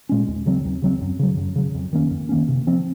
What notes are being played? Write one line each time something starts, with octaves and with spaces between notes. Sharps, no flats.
A#2 G#3 C#4
D#2
C#3 F#3 C4
D#2
C#3 F#3 C4
F#2
C#3 F#3
F#2
C#3 F#3
F2
D#3 A#3 C#4
F2
D#3 A#3 C#4
C3
F3 C4